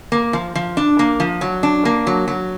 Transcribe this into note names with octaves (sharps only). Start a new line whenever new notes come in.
A#3
F3
F3
D4
A#3
F3
F#3
D4
A#3
F#3
F#3